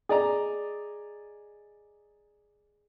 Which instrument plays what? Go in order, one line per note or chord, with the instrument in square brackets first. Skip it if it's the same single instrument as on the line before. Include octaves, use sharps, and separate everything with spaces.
[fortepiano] G#4 D5 D#5 A#5